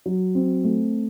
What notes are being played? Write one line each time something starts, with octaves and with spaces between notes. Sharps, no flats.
F#3
C4
A3